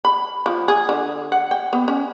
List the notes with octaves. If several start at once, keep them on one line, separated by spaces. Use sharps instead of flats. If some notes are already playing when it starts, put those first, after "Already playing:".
B5
F3
G#4
D3
F#5
G5
B3
C#4